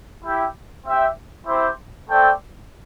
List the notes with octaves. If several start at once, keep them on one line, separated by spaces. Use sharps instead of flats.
E4 G4 E5 G5
C4 G4 E5 G5
C4 E4 G4 C5 E5
A3 C4 A4 D5 G5